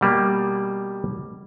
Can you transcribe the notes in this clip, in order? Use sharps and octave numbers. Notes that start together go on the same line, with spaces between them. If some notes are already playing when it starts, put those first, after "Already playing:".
B2 G3 A#3